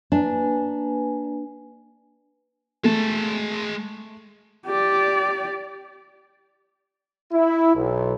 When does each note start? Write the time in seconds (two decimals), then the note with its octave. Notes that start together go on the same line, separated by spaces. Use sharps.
0.12 A#3 D4 B4 G#5
2.84 G#3 A3 A5
4.67 G4 D5
7.33 E4
7.74 B1